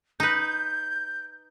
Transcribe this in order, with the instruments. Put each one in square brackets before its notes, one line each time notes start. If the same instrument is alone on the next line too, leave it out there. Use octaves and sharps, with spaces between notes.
[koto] D#4 B4 [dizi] G6